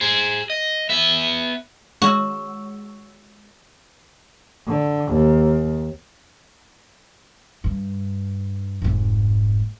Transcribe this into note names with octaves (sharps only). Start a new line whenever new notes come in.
G#4 C5
D#5
B3 E5
G#3 F#4 C#5 E6
D3
D#2
G2
F1 G#2